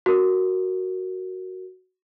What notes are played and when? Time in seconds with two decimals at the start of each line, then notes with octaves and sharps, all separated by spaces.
0.06 F#4 A#4